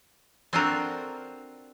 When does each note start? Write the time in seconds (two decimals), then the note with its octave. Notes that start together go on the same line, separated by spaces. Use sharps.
0.53 C4 D4 F4 F#4 A4 A#4